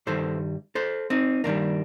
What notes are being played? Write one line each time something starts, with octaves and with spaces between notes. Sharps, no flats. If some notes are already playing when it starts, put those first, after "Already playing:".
G2 D#3 G3 A4 C5
A4 C5
C4 D#4
G2 D#3 G3 A#3 D4